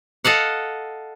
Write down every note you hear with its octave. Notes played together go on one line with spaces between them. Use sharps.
A4 D#5 F5 F#5